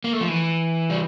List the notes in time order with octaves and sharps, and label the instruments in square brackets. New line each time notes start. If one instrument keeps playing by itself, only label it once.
[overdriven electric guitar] A#3
A3
F3
E3
G3